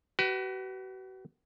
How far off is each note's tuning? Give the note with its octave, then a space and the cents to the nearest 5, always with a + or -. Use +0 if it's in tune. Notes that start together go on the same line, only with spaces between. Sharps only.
F#4 +40 B4 +5